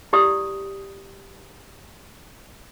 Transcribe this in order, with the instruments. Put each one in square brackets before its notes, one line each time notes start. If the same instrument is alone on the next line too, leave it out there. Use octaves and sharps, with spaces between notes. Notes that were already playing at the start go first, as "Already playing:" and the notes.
[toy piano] E4 G4 D5 D#6